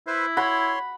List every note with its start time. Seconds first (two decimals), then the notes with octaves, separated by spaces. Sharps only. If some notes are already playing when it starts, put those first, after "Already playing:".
0.07 E4 B4 C5 E5
0.37 C#5 F#5 B5 C6